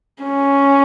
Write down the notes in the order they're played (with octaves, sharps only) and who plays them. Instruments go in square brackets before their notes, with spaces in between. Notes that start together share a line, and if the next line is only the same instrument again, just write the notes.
[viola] C#4